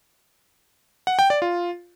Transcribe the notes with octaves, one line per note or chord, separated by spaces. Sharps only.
F#5
G5
D5
F4